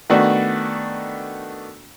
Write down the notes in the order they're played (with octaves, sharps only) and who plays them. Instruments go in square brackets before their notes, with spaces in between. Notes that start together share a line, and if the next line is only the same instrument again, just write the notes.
[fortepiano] D#3 A3 B3 D4 F#4